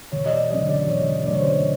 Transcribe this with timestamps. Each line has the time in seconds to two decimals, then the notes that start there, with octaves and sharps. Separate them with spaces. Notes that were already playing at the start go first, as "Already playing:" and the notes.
0.12 E1 C#5
0.26 D#5
0.31 D5
0.50 D2 C#3 F#3 D#5
0.69 D5
0.88 E1 C#5
1.25 D2 C#3 F#3 D5
1.33 C#5
1.40 C5
1.46 C#5